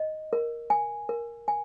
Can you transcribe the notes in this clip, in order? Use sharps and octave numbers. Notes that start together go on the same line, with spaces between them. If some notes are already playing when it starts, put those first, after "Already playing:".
Already playing: D#5
A#4
G#5
A#4
G#5